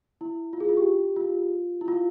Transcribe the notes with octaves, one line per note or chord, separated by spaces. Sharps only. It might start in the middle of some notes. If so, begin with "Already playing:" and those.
E4
F4
G#4
F4
G4
F4
E4
F4